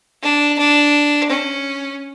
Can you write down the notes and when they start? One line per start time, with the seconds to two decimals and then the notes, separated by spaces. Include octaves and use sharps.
0.22 D4
0.58 D4
1.29 C#4